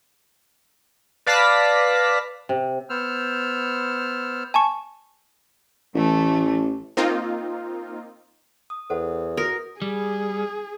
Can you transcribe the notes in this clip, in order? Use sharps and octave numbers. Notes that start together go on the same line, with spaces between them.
B4 D5 F5 A5 A#6 B6
C3
B3 C5 E6 F6
G#5 A5 C#6
A1 E3 A3
A#3 C4 D#4 F4
D#6
E2 A4 C5 F#5
F#4 A#4 D#6
G3 G#4